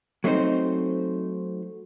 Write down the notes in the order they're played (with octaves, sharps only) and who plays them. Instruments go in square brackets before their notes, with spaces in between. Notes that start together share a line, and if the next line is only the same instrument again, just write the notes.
[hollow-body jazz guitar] F#3 A3 C4 D#4 C5